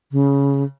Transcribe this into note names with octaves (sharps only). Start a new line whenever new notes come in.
C#3